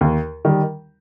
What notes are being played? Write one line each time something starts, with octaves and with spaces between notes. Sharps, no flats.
D#2
D#3 G3